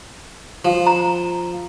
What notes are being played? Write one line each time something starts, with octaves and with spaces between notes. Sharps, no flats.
F3
A#5